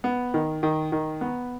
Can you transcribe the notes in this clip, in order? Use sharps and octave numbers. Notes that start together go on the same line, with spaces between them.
B3
D#3
D#3
D#3
B3